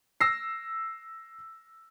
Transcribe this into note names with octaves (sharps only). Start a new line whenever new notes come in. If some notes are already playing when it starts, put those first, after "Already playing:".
E6 A#6 C7